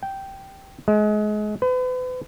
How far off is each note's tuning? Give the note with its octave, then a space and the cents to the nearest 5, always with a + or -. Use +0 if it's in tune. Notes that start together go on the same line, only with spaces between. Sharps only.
G5 -10
G#3 +30
B4 +40